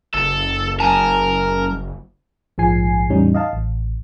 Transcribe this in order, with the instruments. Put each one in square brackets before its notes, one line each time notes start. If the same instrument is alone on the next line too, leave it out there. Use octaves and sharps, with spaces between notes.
[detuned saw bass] F#1 [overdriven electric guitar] A4
[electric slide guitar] F#2 G#5 A5 [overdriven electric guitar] A#4
[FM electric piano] A#1 G#2 F3 G#3 G#5 C7
E2 A2 G3 C#4 D#4
D#5 F5 A5
A1